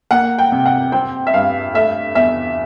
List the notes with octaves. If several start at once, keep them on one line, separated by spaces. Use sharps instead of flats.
A#3 F#5
G5
C3
F#5
C4 G5
E5
G2 F5
A3 E5
E2 E5